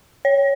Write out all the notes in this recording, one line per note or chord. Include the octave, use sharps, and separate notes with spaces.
C#5